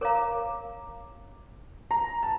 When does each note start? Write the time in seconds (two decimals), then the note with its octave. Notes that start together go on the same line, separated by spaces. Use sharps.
0.01 A#4 C#5 F5 A#5 D6
1.91 A#5
2.23 A5